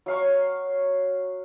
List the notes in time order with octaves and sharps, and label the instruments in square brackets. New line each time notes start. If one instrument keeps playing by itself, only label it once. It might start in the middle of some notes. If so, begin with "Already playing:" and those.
[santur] F#3 F5 C#6